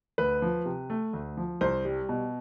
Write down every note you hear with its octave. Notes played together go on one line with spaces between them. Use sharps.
D2 B4
F3
C3
A3
D2
F3
C2 C5
G3
B2